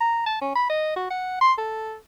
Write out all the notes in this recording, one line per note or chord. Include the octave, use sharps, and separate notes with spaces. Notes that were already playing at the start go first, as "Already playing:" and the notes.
A#5
A5
C#4
B5
D#5
F#4
F#5
C6
A4